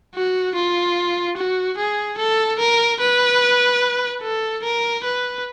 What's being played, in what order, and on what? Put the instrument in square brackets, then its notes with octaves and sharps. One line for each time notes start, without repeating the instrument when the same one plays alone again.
[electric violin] F#4
F4
F#4
G#4
A4
A#4
B4
A4
A#4
B4